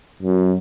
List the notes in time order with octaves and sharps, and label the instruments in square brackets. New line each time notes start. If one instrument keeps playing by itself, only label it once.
[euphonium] F#2